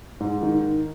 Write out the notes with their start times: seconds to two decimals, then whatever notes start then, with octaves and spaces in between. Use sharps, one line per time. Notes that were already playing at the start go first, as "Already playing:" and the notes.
0.20 G#2
0.43 D#3